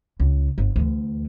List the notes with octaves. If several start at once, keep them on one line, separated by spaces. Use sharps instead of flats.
C#2
G1
D2 E3